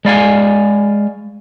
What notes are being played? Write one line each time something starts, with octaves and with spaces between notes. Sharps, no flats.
G#3 D5 F5 G#5